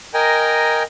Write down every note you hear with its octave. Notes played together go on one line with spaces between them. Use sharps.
A#4 D#5 G5 G#5 A#5